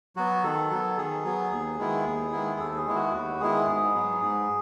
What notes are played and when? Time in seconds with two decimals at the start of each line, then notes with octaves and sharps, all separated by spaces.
0.16 F#3 B3 F#4
0.44 D#3 A4
0.70 F#3 B3
0.97 D#3 G#4
1.24 F#3 B3
1.51 D#2
1.78 D#3 G#3 B3 E4
2.05 D#2
2.32 D#3 G#3 B3 E4
2.59 D#2 A4
2.77 G#4
2.86 D#3 G#3 B3 E4
2.95 F#4
3.13 D#2 F#4
3.40 D#3 G#3 B3 E4 G#4
3.67 G#2
3.94 F#3 B3
4.21 G#2